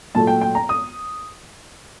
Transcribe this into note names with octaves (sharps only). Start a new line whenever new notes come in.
A#2 F#3 A3 A5
G5
G5
A#5
D#6